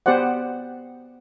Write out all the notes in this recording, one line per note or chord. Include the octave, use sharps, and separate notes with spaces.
B3 G4 C5 D5 F#5